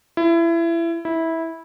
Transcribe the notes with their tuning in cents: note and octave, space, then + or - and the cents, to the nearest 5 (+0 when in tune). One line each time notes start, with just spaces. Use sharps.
E4 +25
E4 -15